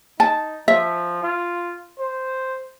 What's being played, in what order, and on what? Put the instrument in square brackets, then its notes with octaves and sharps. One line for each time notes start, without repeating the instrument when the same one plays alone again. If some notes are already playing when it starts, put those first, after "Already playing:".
[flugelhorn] D#4 [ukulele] A5
[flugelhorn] F3 [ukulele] E5
[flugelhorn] F4
C5